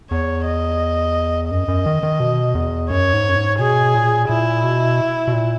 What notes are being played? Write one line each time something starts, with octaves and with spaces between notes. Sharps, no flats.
E2 C#5
D#5
F#2 D#5
F#2
D#3
D#3
B2
E2
F#2 C#5
G#2
F#2
G#2
B2 G#4
A#2
A#2 E4
B2
B2
A#2